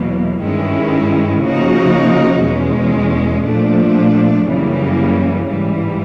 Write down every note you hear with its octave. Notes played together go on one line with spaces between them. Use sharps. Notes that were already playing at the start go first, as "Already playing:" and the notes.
Already playing: E2 B2 F#3 A#3
G2 D#3 G#3 C#4 E4
C#3 F3 A#3 D#4 F#4
E2 B2 G#3 C#4
A#2 F3 A3 D4
F#2 C#3 E3 G3 A#3
G#2 E3 G3